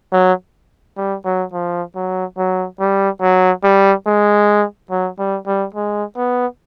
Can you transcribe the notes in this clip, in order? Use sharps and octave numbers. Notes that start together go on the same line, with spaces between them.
F#3
G3
F#3
F3
F#3
F#3
G3
F#3
G3
G#3
F#3
G3
G3
G#3
B3